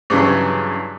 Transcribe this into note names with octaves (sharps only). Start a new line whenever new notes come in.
G2 C#3 E3 F#3